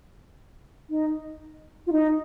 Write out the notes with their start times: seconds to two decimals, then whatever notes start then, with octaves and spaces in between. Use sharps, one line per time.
0.90 D#4
1.87 F4
1.92 D#4